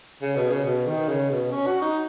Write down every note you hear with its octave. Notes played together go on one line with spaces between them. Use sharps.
C#3
B2
C#3
B2
D#3
C#3
B2
C#4
F#4
D#4